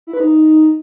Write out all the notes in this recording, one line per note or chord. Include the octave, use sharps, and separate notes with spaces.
E4
B4
D#4